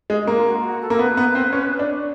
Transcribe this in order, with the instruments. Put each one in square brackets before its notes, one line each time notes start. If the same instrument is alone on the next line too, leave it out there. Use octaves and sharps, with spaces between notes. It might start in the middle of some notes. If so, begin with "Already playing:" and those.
[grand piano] G#3
A#3
[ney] F4
F#4
F4
F#4
A4
[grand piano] A#3
[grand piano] B3 [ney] B4
[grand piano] B3
C4
C#4
D4